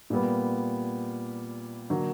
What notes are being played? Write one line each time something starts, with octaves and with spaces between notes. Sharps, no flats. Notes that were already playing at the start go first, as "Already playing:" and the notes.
A#2 G3 B3
D3 F#3 A#3